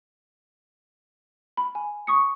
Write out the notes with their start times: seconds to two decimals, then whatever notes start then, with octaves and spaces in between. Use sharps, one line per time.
1.57 B5
1.75 G#5
2.07 C#6 D#6 C#7